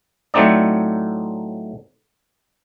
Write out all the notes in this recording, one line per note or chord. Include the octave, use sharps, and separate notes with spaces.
A2 F#3 A3 C4 D#4 D5